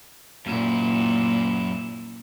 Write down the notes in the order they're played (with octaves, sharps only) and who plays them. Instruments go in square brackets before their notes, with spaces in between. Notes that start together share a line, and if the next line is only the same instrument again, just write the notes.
[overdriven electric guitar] F#2 E4 [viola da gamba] A#2